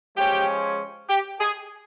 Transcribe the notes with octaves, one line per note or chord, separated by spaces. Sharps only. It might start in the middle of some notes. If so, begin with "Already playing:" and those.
F3 G#3 C#4 G4
G4
G#4